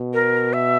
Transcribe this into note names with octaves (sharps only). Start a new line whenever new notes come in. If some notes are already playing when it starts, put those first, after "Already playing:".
Already playing: B2
A#4
E5